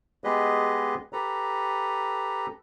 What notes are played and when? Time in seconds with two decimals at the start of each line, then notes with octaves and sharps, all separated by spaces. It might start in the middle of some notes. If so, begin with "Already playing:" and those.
0.24 G#3 B3 G4 G#4 B4 D#5
1.13 G4 A4 B4 A#5